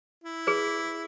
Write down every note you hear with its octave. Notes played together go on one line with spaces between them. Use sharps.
E4
G#4 B4